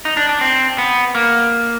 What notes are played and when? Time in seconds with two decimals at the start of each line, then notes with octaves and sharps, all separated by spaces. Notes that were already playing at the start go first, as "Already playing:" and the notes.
0.05 D#4
0.17 D4
0.29 D4
0.41 C4
0.78 B3
1.15 A#3